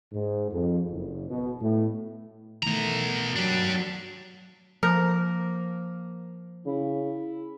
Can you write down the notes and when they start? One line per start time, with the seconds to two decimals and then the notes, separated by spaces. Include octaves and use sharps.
0.13 G#2
0.52 F2
0.91 F#1
1.29 B2
1.61 A2
2.63 B2 D#3 E3 A3 A#5
3.36 F#3 D4 G4
4.83 F3 A#3 A#4
6.66 C#3 E4